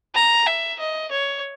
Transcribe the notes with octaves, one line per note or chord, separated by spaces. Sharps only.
A#5
E5
D#5
C#5